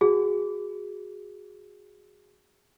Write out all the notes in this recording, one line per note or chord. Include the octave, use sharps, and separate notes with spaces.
F#4 G#4